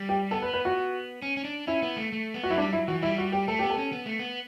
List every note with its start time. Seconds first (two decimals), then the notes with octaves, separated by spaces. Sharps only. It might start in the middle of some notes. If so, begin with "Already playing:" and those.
Already playing: G3
0.09 G4
0.31 B3 A4
0.42 B4
0.53 B4
0.65 F#4
1.22 C#4
1.37 C#4
1.45 D4
1.67 C#4 E4
1.82 B3
1.97 A3
2.12 A3
2.34 B3
2.44 F#4
2.50 F#3 E4
2.58 G3 D4
2.72 F#3 E4
2.88 E3 F#4
3.03 G3 E4
3.18 F#4
3.32 G4
3.48 A3 A4
3.59 B3 G4
3.70 A4
3.78 C#4
3.92 B3
4.06 A3
4.19 B3